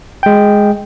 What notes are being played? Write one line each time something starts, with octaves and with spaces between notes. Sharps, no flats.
G#3 G5